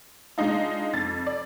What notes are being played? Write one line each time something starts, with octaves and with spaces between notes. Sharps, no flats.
G#3 D4 D#4 F4
F2 A6
D5